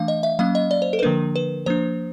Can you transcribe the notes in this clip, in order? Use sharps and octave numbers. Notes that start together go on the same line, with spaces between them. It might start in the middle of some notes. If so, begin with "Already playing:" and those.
Already playing: E3 A3 D4 F5
D#5
E5
F#3 A#3 C#4 F5
D#5
D5
C5
A4
B4
D3 F3 A#3 D4 A#4
B4
F3 A#3 D4 C5